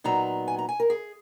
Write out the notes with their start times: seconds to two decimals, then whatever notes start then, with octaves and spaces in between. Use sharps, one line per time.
0.04 A#2 F#3 B3 D#4 A#5
0.48 G#5
0.59 A#5
0.69 G#5
0.80 A#4
0.90 G#4